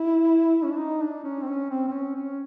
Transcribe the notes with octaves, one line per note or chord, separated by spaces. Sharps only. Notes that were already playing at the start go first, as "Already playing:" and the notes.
Already playing: E4
C#4
D4
D#4
D4
C#4
C4
C#4
C4
C4
C#4
C#4